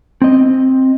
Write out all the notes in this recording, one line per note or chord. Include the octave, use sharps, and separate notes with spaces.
C4 D#5